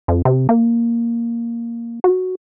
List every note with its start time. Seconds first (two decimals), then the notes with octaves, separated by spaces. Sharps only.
0.08 F2
0.25 C3
0.49 A#3
2.04 F#4